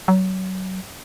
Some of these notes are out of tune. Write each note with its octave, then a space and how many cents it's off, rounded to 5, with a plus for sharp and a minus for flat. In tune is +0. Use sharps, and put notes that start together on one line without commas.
F#3 +25